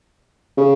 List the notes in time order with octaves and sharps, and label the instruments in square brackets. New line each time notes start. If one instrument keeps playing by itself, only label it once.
[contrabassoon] C#3